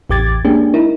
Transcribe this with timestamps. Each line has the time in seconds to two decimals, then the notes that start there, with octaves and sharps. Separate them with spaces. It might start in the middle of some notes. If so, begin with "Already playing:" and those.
0.10 A1 E2 G4 D6 G#6 A6
0.45 G#3 A#3 C#4 D4 G4 G#4
0.74 D#4 E4 A#4